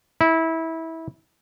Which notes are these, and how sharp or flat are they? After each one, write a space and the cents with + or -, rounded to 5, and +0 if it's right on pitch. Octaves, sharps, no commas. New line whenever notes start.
E4 -20